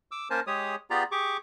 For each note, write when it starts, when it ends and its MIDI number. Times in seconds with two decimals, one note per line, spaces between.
0.11 0.28 86
0.11 0.28 88
0.30 0.40 58
0.30 0.40 61
0.30 0.40 70
0.30 0.40 72
0.30 0.40 80
0.30 0.40 81
0.47 0.76 56
0.47 0.76 67
0.47 0.76 68
0.47 0.76 73
0.47 0.76 87
0.90 1.04 59
0.90 1.04 65
0.90 1.04 67
0.90 1.04 68
0.90 1.04 74
0.90 1.04 82
1.12 1.37 67
1.12 1.37 68
1.12 1.37 85
1.12 1.37 86